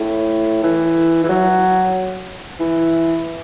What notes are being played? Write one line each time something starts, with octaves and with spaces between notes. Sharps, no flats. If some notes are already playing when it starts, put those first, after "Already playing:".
Already playing: A2
E3
E3
F#3
E3